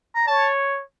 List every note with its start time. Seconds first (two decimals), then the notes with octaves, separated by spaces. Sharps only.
0.15 A#5
0.27 C#5 A5